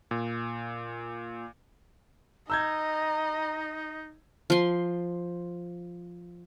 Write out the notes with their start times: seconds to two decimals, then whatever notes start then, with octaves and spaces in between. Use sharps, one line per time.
0.11 A#2
2.50 D#4 D#5 A#5 E6 G6 G#6
4.50 F3 C6